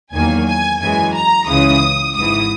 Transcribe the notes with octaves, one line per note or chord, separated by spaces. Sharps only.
E2 D#3 F#3 A#3 G#5
G#5
F#2 E3 G#3 G#5
A#5
C#2 C#3 E3 G#3 D#6
G#1 G#2 E3 D#6